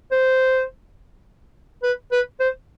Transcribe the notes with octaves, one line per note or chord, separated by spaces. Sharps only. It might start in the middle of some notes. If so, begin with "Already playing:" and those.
C5
B4
B4
C5